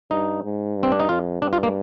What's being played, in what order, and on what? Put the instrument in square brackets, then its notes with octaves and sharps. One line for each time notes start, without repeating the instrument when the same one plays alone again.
[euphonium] G2 [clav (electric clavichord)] D#4
[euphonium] G#2
G2
[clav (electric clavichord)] C4
D4
D#4
[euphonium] F2 [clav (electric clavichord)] F4
[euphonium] G2 [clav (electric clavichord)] D4
[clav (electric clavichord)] F4
A#3